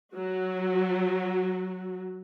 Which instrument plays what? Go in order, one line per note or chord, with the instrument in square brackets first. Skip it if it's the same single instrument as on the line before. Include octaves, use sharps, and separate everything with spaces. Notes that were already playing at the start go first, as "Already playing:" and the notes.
[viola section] F#3 F#4